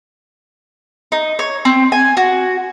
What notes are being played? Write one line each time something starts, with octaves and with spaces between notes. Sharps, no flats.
D#4
C#5
C4
G#5
F#4